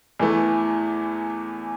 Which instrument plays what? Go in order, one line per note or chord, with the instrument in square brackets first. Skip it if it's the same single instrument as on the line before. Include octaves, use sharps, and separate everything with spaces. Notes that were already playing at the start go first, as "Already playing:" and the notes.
[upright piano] E2 E3 A3